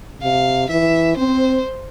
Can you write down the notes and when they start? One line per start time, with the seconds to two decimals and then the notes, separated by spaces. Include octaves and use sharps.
0.22 C3 F5
0.69 E3 E5
1.17 C4 C5